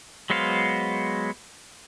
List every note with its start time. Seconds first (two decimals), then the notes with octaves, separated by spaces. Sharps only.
0.30 F#3 G#3 B3 C5 F5